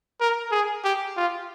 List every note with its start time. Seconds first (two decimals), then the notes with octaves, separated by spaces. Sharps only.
0.20 A#4
0.51 G#4
0.84 G4
1.17 F4